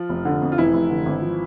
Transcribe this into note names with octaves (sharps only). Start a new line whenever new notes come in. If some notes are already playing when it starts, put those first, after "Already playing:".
Already playing: F3 F4
F1
D3
F2
F4
F1 E3 E4
F1
D3
G#1
F3